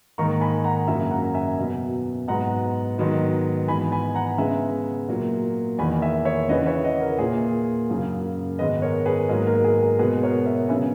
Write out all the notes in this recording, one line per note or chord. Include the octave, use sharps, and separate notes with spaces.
G#2 D#3 A#3 A#5 C#6
G#5 B5
F#5 A#5
F#2 C#3 F#3 A#3 E5 G#5
F#5 A#5
E5 G#5
B2 F#3 B3
G#2 F#3 B3 F#5 A#5
G#2 D#3 F#3 B3
G#2 E3 B3 G#5 B5
G#5 B5
F#5 A#5
C#3 G#3 B3 E5 G#5
A#2 F#3 A#3
E2 D#3 A#3 G#5 B5
E5 G#5
C#5 E5
E2 C#3 E3 B4 D#5
C#5 E5
D#5 F#5
A#4
A#2 A#3 G#4
F#2 C#3 F#3 A#3
G#2 D#3 G#3 B3 B4 D#5
B4
A#4 C#5
G#4 B4
G#2 F#3 A#3
A#4
G#4
G#4
B2 G#3 B3 G#4 B4
A#4 C#5
C#5 E5
C#3 F#3 B3 E5 G#5